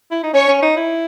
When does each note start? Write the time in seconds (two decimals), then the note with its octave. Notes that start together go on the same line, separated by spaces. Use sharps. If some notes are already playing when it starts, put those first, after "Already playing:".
0.11 E4
0.23 D#4
0.34 C#4 C#5
0.48 C#4
0.62 D#4
0.77 E4